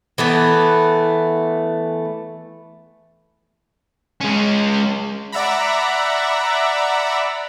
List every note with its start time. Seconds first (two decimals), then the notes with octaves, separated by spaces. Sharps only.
0.18 E3 A3 B3
4.21 G#3 C#4
5.32 D5 E5 F#5 A#5 B5